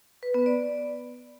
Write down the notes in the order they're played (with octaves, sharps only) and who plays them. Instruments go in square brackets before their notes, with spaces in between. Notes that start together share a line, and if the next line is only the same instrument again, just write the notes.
[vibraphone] B4
B3
D5